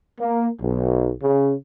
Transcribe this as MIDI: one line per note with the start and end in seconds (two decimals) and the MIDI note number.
0.20 0.49 58
0.61 1.11 35
1.23 1.54 49